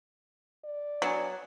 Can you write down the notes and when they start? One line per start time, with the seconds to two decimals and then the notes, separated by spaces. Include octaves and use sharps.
0.64 D5
1.02 F#3 B3 D4 G#5